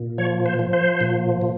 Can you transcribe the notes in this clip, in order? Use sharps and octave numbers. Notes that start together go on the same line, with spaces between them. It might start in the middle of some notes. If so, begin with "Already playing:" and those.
Already playing: A#2
F3 C#5
C5
F3
C5
A#2
A#2